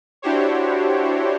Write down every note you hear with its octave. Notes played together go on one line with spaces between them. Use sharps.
D4 E4 F#4 G4 C5 C#5